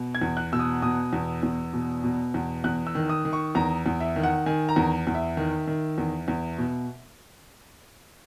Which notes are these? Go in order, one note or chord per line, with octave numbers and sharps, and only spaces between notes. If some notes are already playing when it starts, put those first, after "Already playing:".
Already playing: B2
G#6
E2
F#6
B2 E6
D#6
B2 D#6
E2
E2
B2
B2
E2
E2 F#6
E6
D#3
D#6
D#3
C#6
E2 A#5
E2
E5
D#3
F#5
D#3 G#5
A#5
E2
E2
E5
D#3
D#3
E2
E2
B2